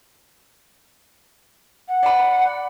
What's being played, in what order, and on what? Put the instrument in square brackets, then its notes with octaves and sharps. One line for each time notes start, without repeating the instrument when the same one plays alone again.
[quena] F#5
[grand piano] D5 B5